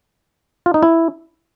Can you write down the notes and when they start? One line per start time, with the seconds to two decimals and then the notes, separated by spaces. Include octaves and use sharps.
0.66 F4
0.74 D#4
0.83 E4